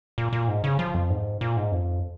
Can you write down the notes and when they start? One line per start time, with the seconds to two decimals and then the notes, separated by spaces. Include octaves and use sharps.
0.18 A#2
0.33 A#2
0.48 G#2
0.64 C#3
0.79 F3
0.95 F2
1.10 G#2
1.41 A#2
1.57 G#2
1.72 F2